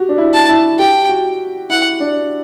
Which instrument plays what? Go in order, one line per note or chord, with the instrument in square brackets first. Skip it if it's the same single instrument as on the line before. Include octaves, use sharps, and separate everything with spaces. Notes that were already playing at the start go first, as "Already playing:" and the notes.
Already playing: [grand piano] F#4 G4
D4
E4
[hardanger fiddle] A5
[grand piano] E4
[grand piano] G4 [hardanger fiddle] G5
[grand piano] F#4
[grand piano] E4 [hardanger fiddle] F#5
[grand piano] D4